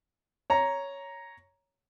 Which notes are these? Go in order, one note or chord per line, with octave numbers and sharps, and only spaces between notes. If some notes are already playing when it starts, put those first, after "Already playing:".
C#5 A#5